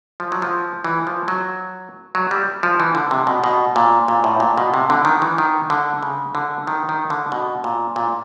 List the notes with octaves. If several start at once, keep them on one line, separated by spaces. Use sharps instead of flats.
F3
F#3
F3
E3
F3
F#3
F#3
G3
F3
E3
D3
C3
B2
B2
A#2
A#2
A2
A#2
B2
C3
D3
D#3
E3
D#3
D3
C#3
D3
D#3
D#3
D3
B2
A#2
A#2